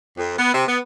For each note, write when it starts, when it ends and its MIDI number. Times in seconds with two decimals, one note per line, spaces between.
0.17 0.33 41
0.38 0.53 59
0.54 0.64 48
0.68 0.78 59